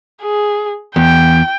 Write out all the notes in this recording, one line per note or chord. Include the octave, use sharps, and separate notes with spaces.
G#4
E2 G5